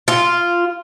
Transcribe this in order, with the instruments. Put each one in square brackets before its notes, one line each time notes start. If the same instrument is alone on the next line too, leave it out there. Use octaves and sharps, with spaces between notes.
[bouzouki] F4